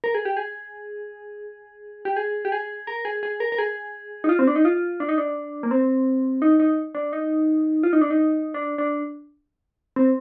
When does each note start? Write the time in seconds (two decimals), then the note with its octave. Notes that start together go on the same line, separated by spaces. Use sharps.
0.04 A#4
0.15 G#4
0.25 G4
0.37 G#4
2.05 G4
2.16 G#4
2.45 G4
2.52 G#4
2.87 A#4
3.05 G#4
3.23 G#4
3.40 A#4
3.52 A#4
3.58 G#4
4.24 D#4
4.29 F4
4.39 C4
4.47 D4
4.56 D#4
4.65 F4
5.00 D4
5.09 D#4
5.18 D4
5.63 A#3
5.71 C4
6.42 D#4
6.60 D#4
6.95 D4
7.13 D#4
7.83 F4
7.93 D#4
8.01 D4
8.10 D#4
8.54 D4
8.78 D4
9.96 C4